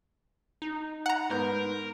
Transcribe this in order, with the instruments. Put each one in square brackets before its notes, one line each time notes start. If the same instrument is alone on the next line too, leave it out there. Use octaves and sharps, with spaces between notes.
[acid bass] D#4
[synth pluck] F#5 A#5
[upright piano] G#2 B3 G6 [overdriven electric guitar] A#4